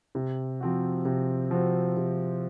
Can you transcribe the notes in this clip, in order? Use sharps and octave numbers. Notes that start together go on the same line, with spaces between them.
C3
F3 C4 F#4
C3
F3 C4 F#4
C3